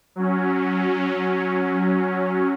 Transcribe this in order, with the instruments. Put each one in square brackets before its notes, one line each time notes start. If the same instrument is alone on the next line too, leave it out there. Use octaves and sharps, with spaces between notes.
[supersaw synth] F#3 C#4